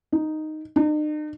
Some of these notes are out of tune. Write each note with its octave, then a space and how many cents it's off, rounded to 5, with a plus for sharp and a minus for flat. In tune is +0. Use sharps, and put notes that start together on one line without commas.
D#4 -5
D#4 -45